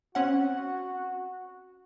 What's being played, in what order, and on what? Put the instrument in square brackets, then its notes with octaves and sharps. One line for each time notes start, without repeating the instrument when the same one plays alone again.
[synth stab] C4 C#4 F#5 [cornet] F#4